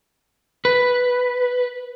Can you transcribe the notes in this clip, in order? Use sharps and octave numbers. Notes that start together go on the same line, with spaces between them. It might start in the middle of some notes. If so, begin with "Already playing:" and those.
B4